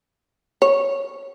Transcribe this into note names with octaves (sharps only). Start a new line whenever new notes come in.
C#5